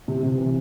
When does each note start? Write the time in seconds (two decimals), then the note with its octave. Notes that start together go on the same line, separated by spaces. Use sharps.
0.08 C3
0.23 C3
0.38 E3